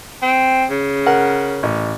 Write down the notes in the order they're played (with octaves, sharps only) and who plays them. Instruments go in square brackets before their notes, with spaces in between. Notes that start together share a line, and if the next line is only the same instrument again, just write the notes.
[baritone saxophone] C4
C#3
[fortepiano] A#4 F#5
A1